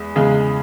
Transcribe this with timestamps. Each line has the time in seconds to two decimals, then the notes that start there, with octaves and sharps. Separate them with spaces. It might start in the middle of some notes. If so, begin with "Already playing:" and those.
Already playing: E2 G#3
0.16 E2 C#3 G#3